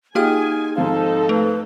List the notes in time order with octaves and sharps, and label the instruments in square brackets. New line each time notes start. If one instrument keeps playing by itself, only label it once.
[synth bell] A#3 G4 F6 [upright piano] D#4 F4 G5 [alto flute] G#4 [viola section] G#5
[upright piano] G#2 F3 C4 [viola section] D#4 A4 [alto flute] F5
[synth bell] A3 [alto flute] B4